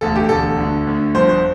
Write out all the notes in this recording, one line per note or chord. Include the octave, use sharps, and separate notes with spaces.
E1 D2 D3 A4
G4
E1 D2 D3 A4
D2 D3
D2 D3
G1 F2 D3 C5
C5